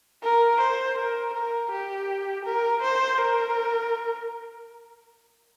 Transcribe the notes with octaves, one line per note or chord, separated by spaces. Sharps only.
A#4
C5
A#4
A#4
G4
A#4
C5
A#4